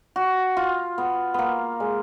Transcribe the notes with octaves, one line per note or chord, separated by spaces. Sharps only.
F#4
F4
B3
A#3 B3
G#3